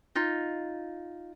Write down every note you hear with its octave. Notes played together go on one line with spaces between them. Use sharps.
D#4 F4